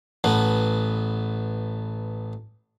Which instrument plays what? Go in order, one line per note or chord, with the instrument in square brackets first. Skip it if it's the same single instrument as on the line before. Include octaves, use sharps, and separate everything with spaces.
[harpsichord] A1 B3